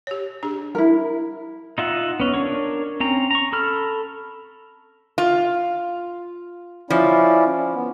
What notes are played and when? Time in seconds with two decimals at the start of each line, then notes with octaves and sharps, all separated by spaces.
0.07 G4 C#5
0.43 D4 G4 G#4
0.75 E4 A#4
1.78 D#4 F4 E5 F#5
2.20 B3 C#4
2.34 D4 A#4 C#5 C#6
3.00 C4 C#4 A#5
3.31 A#5 C#6
3.53 A4 B5 F6
5.18 F4
6.90 F3 C#4 E4 D5
7.75 B3